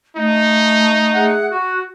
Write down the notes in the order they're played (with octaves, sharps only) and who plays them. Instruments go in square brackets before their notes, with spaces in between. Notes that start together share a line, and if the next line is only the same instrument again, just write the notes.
[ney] A3 [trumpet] D#4
[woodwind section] G#4 E5 F#5
F#4